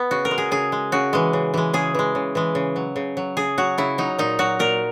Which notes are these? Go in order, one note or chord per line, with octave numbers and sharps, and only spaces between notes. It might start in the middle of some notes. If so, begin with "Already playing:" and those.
Already playing: B3
C#3 F#4
A#4
G#3
G#4
C#3 G#4
G#3
C#3 F#4
E3 G#3
C#3
E3 G#3
C#3 G#4
E3 G#3
C#3
E3 G#3
C#3
F#3
C#3
F#3
C#3 G#4
F#3 F#4
C#3 E4
F#3 D#4
A#2 D#4
F#3 F#4
A#2 A#4